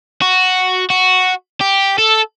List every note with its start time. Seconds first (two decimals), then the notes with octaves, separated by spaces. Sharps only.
0.22 F#4
0.90 F#4
1.61 G4
1.98 A4